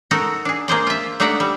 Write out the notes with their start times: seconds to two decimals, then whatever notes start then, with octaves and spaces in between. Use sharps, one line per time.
0.11 D#4 F#4 A4 A#4
0.45 D4 G#4
0.68 A#3 G#4 C5 D5
0.87 F4 E5
1.20 A3 D4 D#4 D5 E5 F#5
1.40 G3